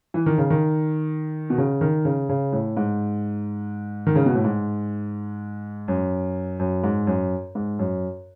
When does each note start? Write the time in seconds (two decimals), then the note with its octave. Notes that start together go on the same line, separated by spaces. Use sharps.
0.14 E3
0.26 D#3
0.38 C#3
0.50 D#3
1.50 B2
1.58 C#3
1.81 D#3
2.05 C#3
2.29 C#3
2.52 A2
2.77 G#2
4.07 D#3
4.15 C#3
4.26 B2
4.35 A2
4.44 G#2
5.88 F#2
6.59 F#2
6.84 G#2
7.07 F#2
7.55 G#2
7.79 F#2